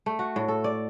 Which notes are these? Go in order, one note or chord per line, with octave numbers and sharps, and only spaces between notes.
A3
F#4
A2
A4
D5